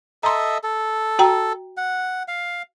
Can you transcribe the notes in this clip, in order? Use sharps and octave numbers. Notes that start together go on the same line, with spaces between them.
A4 D#5 E5 A#5 C6
A4
F#4 G5 A#5
F#5
F5